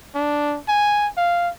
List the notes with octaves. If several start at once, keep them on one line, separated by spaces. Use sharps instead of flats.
D4
G#5
F5